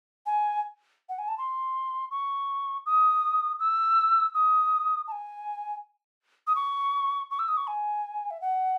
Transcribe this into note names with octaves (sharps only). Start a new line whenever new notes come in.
G#5
F#5
G#5
A5
C6
C#6
D#6
E6
D#6
A5
G#5
D#6
C#6
C#6
E6
D#6
C#6
G#5
E5
F#5